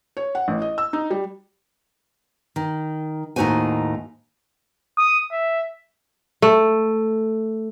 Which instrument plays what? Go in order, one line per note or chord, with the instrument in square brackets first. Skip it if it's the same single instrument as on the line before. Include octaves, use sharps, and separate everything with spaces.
[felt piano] C#5
F#5
A1
D#5
E6
D#4
G3
[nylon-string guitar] D#3
D#2 A2 D#4 F#4 C5 G#5
[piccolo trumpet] D#6
E5
[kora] A3